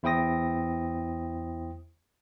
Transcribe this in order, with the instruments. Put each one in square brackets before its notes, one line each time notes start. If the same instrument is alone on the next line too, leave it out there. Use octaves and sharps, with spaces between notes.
[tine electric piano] E2 E4 C5 G5 D#6 A#6